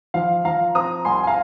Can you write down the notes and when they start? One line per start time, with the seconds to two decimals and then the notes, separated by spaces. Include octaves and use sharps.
0.14 F3 F5
0.45 F3 F5 A#5
0.75 C4 A#5 D#6
1.05 C2 G#5 C6
1.23 G#5
1.27 F5 A#5